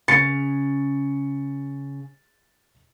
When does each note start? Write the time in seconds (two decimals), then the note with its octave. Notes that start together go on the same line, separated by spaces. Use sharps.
0.08 C#3 A6 C#7